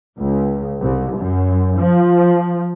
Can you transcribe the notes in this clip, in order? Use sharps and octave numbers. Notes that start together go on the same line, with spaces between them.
C#2
C2
F#2
F3